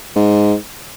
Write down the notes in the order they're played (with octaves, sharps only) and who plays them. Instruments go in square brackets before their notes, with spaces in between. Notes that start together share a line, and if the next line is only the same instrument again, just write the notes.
[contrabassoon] G#2